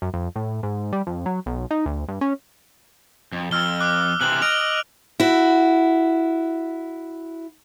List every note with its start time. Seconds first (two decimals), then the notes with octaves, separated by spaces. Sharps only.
0.02 F#2
0.14 F2
0.36 A2
0.63 G#2
0.93 G3
1.07 F2
1.26 F#3
1.46 B1
1.71 D#4
1.86 D2
2.08 G2
2.21 C#4
3.32 F2
3.51 F2 E6 F6 G7
3.80 D6 F#6
4.21 C3 E3 C4 F#6 F#7
4.42 D#5 F6 D7 F7
5.20 E4 F#4